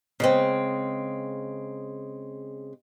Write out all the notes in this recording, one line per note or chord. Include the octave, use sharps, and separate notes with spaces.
C#3 G#3 C4